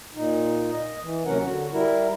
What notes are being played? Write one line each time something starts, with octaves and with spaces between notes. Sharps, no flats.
A#2 D#4
D#5
E3
D#2 C3 F#3 C#4 A#4 F#5
D3 F#4
G3 E4 A#4